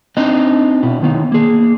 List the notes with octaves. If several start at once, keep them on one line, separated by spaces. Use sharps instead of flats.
C4 D4 D#4 D#5
B2 E4
D#3 B3 D#4
A#3 G#4